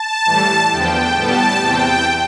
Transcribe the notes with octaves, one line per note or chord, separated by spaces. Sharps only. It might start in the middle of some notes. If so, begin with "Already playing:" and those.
Already playing: A5
A2 E3 G3
E2 D3 F3 B3 G5
A2 G3 B3 A5
E2 C3 E3 G5